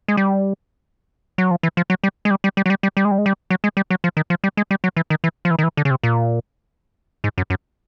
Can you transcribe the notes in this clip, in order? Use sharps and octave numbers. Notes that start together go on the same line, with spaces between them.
G#3
G3
F#3
F3
E3
F3
F#3
G3
G#3
G3
G3
G3
F#3
G3
G3
G3
G#3
G3
G#3
G3
F#3
G#3
G3
F#3
F3
D#3
F3
G3
G#3
G3
F#3
E3
D#3
E3
F3
E3
D#3
E3
D3
C#3
C3
A#2
G#2
F#2
F#2